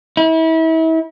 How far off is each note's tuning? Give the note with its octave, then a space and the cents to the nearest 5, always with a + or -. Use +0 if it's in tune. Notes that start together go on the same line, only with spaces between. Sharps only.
E4 -35